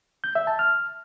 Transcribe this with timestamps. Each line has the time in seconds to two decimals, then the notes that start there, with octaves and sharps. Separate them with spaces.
0.24 G6
0.35 E5
0.47 A5
0.59 F6